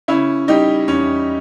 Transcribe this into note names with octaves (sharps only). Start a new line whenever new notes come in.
C#3 C#4 E4
G3 D#4 G4
E2 C#4